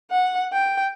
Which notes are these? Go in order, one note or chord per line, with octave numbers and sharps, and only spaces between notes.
F#5
G5